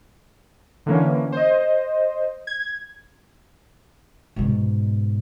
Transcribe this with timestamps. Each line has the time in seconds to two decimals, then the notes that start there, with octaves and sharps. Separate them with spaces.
0.86 D3 E3 A#3 C#4
1.32 C5 D#5
2.47 G#6
4.36 G#2 B2